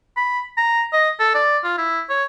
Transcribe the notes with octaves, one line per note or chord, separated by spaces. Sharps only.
B5
A#5
D#5
A4
D5
F4
E4
C#5